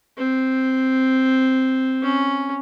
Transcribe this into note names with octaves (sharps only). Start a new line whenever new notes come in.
C4
C#4